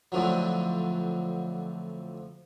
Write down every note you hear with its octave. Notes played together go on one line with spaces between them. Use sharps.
F2 A2 D3 F3 F#3